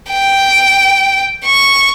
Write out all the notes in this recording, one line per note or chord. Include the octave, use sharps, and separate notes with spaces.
G5
C#6